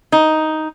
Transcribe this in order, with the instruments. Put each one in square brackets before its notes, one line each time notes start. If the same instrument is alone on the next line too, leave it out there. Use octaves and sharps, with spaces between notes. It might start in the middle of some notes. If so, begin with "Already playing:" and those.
[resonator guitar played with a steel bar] D#4